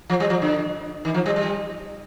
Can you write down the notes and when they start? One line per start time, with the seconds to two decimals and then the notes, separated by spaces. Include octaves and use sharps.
0.10 F3
0.20 G3
0.30 F3
0.42 D3
1.05 D#3
1.14 F3
1.26 G3
1.36 G3